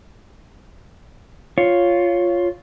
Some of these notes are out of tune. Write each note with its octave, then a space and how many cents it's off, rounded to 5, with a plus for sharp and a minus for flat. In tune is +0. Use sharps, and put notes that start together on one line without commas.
F4 +0 C#5 +0